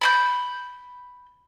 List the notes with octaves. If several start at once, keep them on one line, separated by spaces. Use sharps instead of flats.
B5 C6 G6